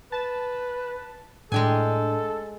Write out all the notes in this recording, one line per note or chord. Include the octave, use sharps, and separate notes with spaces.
B4 A5
A2 G#3 D4 A4 G5 G#5